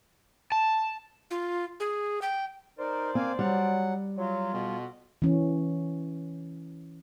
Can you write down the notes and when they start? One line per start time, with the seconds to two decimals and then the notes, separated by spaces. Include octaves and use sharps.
0.52 A5
1.31 F4
1.80 G#4
2.22 G5
2.79 D#4 A#4 C5 D5
3.15 A#3 C4 F5 G#5
3.39 F#3 G3 F#5
4.18 F#3 F4
4.53 F2 B2 B3
5.22 E3 C#4